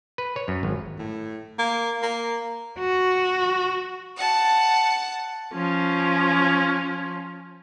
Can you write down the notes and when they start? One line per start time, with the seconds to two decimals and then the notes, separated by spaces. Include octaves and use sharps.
0.18 B4
0.36 C#5
0.48 F#2
0.63 G#1
0.98 A2
1.59 A#3
2.02 A#3
2.79 F#4
4.16 F#5 A5
5.54 F3 C#4